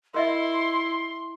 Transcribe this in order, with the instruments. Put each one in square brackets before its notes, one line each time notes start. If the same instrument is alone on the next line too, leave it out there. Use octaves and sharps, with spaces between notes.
[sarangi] E4 [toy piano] A#4 D#5 E5 [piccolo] C6